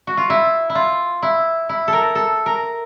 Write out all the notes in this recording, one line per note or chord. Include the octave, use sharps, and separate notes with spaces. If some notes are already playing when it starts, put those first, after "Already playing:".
F#4
F4
E4
E4
F4
E4
E4
A4
A#4
A4
A#4